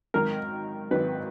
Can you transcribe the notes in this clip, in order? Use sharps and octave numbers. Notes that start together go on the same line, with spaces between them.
G#1 G#2 D#3 F#3 A#4
G#1 G#2 D#3 F#3 B4